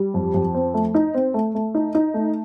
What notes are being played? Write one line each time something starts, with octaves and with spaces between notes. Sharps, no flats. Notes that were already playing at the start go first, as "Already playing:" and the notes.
Already playing: G3
F2
F2
C4
A3
D#4
C4
A3
A3
D#4
D#4
A3